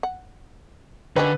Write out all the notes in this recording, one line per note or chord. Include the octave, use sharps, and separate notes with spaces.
F#5
D3 D#3 G3 C#4 B4